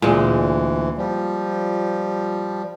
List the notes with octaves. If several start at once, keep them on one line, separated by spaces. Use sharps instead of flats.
D2 A#2 E3 G#3
F3 G3